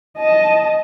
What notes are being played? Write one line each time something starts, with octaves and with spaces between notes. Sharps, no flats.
D#5 A5